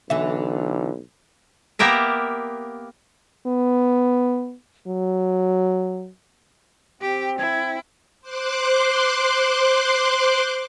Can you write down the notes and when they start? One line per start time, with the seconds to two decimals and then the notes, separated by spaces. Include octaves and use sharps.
0.10 B1 D3 E3 E5
1.79 A#3 B3 G4 A#4 E5
3.47 B3
4.87 F#3
7.01 C4 G4
7.39 E4 G#6
8.21 C5 C6 D6 F#6